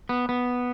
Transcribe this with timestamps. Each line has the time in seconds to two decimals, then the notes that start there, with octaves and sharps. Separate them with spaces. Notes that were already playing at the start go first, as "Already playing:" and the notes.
0.09 B3
0.29 B3